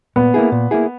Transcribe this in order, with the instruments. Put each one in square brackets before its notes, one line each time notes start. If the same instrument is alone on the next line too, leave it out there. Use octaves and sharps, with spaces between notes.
[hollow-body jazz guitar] A#2 [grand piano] B3
[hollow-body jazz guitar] A#3 E4 G#4
A#2
A#3 E4 G#4